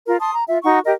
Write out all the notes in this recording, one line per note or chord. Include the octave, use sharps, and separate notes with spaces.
F4 A#4
A5 C6 D#6
A#5
F4 E5
D#4 F#4 F#5 C#6
G4 A#4 D#5